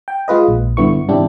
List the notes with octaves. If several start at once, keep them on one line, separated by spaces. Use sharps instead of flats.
G5
G#3 F4 B4 D#5
A#1
G2 D3 B3 E4 C#6
G#2 C3 E3 D4 E4 G4